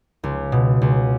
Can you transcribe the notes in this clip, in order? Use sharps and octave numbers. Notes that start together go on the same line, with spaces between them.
C#2
B2
C#2